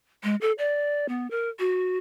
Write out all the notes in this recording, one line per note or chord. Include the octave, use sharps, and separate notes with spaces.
G#3
A4
D5
B3
A#4
F#4